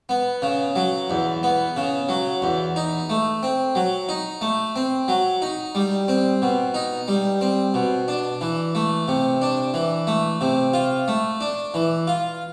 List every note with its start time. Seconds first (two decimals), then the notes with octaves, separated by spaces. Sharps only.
0.09 B3
0.42 C#3
0.76 F#3
1.10 E2
1.43 B3
1.77 C#3
2.09 F#3
2.42 E2
2.76 D#4
3.09 A3
3.43 C4
3.75 F#3
4.09 D#4
4.41 A3
4.76 C4
5.08 F#3
5.42 D#4
5.75 G3
6.08 C4
6.42 B2
6.74 D#4
7.08 G3
7.41 C4
7.74 B2
8.08 D4
8.41 E3
8.75 A3
9.08 C3
9.42 D4
9.74 E3
10.07 A3
10.41 C3
10.73 F4
11.08 A3
11.41 D4
11.74 E3
12.07 F4